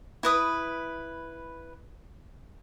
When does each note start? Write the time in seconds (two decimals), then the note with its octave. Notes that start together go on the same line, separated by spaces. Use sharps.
0.23 E4 B4 D#6